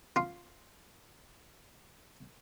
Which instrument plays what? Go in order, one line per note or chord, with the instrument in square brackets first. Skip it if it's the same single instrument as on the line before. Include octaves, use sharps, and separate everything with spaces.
[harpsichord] F4 C6